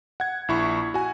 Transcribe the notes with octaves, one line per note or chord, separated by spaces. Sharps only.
F#5 G#6
A#1 E4 C#6
F#4 G#5